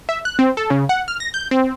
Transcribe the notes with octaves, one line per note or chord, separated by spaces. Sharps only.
E5
F#6
C4
A4
C#3
F#5
F6
A#6
G6
C4